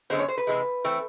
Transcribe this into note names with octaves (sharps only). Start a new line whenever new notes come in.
F#2 D3 F3 G#3 B3 C5
C#5
C5
B4
C3 E3 G#3
E3 A3 C4